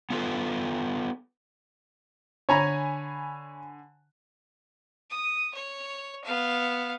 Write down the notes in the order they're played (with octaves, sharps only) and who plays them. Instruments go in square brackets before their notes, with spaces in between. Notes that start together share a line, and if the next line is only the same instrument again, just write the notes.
[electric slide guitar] B3 F4 F#4 A4 B4
[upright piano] D3 G#5 B5 [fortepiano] C#5 A#5
[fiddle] D#6
C#5
B3 F5